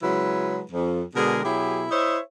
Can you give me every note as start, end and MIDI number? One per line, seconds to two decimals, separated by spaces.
0.03 0.62 49
0.03 0.62 54
0.03 0.62 56
0.03 0.62 64
0.03 0.62 71
0.72 1.03 41
1.16 1.43 47
1.16 1.43 50
1.16 1.43 56
1.16 1.43 68
1.16 1.43 70
1.43 1.85 47
1.43 1.85 54
1.43 1.85 64
1.43 1.85 67
1.43 1.85 68
1.91 2.19 64
1.91 2.19 72
1.91 2.19 73
1.91 2.19 75
1.91 2.19 76